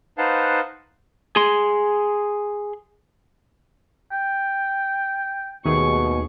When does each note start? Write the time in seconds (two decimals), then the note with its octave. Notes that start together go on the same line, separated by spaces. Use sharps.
0.18 D#4 B4 C5 F5 F#5 A5
1.36 G#4 C6
4.11 G5
5.65 D#2 B2 A3 G#4 C#6